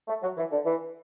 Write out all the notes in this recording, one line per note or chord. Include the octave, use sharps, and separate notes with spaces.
A3
F#3
E3
D3
E3